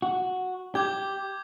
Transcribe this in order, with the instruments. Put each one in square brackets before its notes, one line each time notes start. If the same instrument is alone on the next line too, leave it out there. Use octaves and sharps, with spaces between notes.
[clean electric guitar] F#4
[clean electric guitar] G4 [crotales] D6 G6 G#6